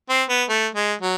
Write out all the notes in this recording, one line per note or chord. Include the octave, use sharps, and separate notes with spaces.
C4
B3
A3
G#3
F#3